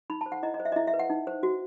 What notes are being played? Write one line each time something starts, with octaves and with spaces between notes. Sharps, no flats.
D#4 B5
A5
C5
F#5
E4 D#5
D#5
C5
E5
D#5
E4 E5
E5
B4
F#5
D#4
C5
F#4